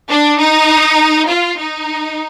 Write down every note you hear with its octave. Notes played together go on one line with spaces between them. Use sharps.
D4
D#4
F4
D#4